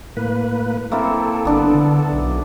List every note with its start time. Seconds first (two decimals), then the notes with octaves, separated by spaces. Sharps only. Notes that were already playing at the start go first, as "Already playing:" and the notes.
0.17 A2 A#3 B4
0.92 A#3 C4 E4 A4
1.45 G1 B3 D4
1.74 D3
2.12 B1